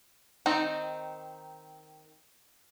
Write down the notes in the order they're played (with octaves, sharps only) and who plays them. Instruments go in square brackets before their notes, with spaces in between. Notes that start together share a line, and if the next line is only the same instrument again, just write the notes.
[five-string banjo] D#3 C4 D#4